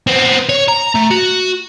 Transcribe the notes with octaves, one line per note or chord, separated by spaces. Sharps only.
B3 C4
C#5
A#5
A3
F#4